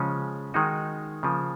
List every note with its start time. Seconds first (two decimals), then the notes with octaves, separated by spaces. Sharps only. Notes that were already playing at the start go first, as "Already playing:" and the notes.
Already playing: C#3 F3 G#3 C#4
0.54 D#3 G#3 D#4 F#4
1.23 C#3 F3 A#3